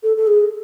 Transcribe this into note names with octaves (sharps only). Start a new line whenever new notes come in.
A4
A4
G#4